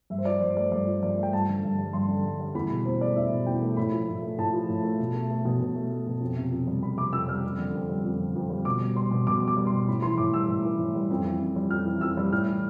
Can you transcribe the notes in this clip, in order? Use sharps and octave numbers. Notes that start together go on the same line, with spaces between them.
G2 E5
C5
F3 D5
G2 C5
A3 D5
G2 D5
F3
G2 D5
A3
G5
G2 A5
D3
G2
G3
G2 C6
D3
G2
G3
E2 B5
B2
E2 C5
A3 D5
E2 E5
B2
E2 G5
A3
A2 B5
F3
A2
A3
A2 A5
F3
A2
A3
B2
A3
A3
B2
B2
A3
A3
B2
F2
C3
F2
G3
F2 B5
C3 D6
F2 E6
G3 F6
F2
D3
F2
G3
F2
D3
F2
G3
B2 D6
G3
G3 C6
B2
B2 D6
G3
D6
G3
C6
B2
A2 B5
E3 C6
A2 D6
G3 E6
A2
E3
A2
G3
F2
E3
F2
G3
F2 F6
E3
F2 E6
G3
A2 F6
E3